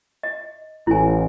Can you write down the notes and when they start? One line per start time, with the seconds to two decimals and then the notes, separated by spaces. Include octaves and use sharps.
0.23 D#5
0.87 A1 E4 G#5